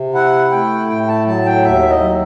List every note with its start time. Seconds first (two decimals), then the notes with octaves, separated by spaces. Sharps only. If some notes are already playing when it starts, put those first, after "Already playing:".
Already playing: C3
0.14 E4 F#5
0.51 A3 G5
0.89 A2 G5
1.08 A5
1.27 F#3 A5
1.46 G5
1.65 D#2 E5
1.90 D#5
2.03 F#3